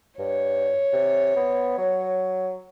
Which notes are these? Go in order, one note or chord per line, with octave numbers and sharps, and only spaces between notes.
G2 C#5
C3
B3
F#3